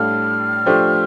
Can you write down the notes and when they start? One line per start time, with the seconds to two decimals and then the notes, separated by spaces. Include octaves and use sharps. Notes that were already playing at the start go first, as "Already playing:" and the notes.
Already playing: A2 G3 D4 A4 F5 F6
0.66 F3 A3 D4 G4 C5